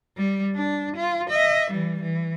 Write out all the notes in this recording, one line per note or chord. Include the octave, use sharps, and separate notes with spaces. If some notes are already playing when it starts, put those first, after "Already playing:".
G3
D4
F4
D#5 E5
E3 G3
E3